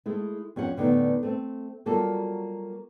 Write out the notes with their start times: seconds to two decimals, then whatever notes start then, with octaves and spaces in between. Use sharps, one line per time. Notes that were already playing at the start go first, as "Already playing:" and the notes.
0.06 G#3 A3 E4
0.56 F2 C#4 G4 F#5
0.76 E2 A2 D3 A3 B3 D#4
1.23 A3 C4
1.86 F#3 G3 A#3 F4 F#4 A4